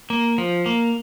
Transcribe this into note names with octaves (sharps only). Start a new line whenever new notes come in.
A#3
F3
A#3